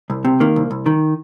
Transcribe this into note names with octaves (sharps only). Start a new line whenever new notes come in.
C2
C3
D#3 A#3
C2
C2
D#3